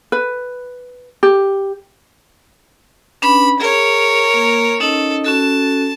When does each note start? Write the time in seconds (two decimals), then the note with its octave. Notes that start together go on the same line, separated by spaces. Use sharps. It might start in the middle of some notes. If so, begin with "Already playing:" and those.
0.12 B4
1.23 G4
3.22 C#4 D4 B4 B5
3.60 G#4 A#4 C#5
4.34 A#3
4.80 C#4 D#4 A4 D#5
5.24 C#4 F#4 A4 A5